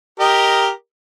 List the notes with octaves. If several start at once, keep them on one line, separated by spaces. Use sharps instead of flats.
G4 A#4 D#5